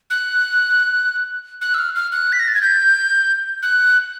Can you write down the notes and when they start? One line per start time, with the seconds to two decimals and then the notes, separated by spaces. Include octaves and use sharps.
0.10 F#6
1.61 F#6
1.74 E6
1.78 F6
1.95 F6
2.12 F#6
2.32 B6
2.39 A#6
2.48 A6
2.55 G#6
2.62 G6
3.62 F#6